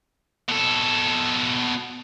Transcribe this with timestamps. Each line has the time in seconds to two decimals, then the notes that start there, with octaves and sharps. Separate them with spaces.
0.48 B2 A4